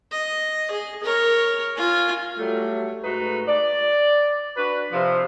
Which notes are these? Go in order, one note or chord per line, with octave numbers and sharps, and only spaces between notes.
D#5
G#4
A#4 C#5
F4 G#5
F#3 G3 A3
G#2 A3 D#4 F#4 B4
D5
D4 F#4 B4
C3 F3